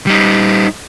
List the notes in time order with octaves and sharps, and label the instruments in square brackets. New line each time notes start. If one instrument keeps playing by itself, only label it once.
[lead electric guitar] G3 D#4